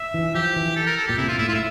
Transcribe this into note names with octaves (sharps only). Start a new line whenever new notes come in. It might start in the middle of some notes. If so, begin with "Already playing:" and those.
Already playing: E5
E3
F3 G4
E3
A4
A#4
A4
A#2 G4
C3 E4
A#2 F4
A2 E4
A2 F4
E5